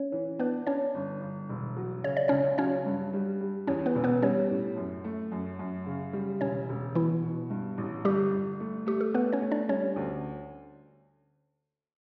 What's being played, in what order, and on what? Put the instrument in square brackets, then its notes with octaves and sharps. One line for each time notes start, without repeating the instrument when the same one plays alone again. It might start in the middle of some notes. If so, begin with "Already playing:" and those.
Already playing: [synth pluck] C#4 C#5
[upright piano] E3
[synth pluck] B3 B4 [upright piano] D4
[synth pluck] C#4 C#5 [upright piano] D4
[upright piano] G1
G1
E1
F#3
[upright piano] C#3 [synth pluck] C#5
[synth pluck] D5
[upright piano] C#2 [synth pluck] C#4 C#5
[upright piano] F#3 [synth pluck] C#4 C#5
[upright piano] G2
G3
G3
[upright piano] E2 [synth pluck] C#4 C#5
[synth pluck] B3 B4
[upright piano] E1
[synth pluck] B3 B4
[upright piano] G3 [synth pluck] C#4 C#5
[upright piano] A2
F#2
A3
F#2
F#2
C#3
G3
[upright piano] E1 [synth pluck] C#4 C#5
[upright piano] E1
[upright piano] B2 [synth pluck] E3 E4
[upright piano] B2
G2
A1
[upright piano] G1 [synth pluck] G3 G4
[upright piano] G1
A3
[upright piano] A3 [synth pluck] G4
[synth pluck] A4
[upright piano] A3 [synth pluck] B3 B4
[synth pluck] C#4 C#5
[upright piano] A3
[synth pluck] D4 D5
[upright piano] G3 [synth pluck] C#4 C#5
[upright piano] D2